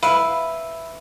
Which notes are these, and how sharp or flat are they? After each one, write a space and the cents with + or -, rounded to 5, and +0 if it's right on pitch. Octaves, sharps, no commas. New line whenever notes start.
E4 +0 B4 +0 F5 +0